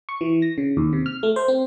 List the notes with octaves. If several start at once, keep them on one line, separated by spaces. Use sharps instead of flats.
C#6
E3
A#6
C#3
D#2
C3
F6
A3
C5
C4